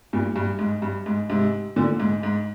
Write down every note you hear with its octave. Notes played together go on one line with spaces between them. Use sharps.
G2 A#2
G2
G#2
G2
G#2
G#2 C3
A#2 D3
G#2
G#2